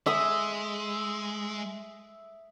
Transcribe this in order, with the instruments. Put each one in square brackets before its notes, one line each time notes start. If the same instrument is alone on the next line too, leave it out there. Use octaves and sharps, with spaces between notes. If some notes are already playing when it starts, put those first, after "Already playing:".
[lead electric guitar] G#3 [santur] E5 D#6 E6